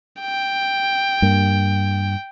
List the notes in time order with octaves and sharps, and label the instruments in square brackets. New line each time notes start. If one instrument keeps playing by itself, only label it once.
[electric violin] G5
[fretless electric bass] G2 A#3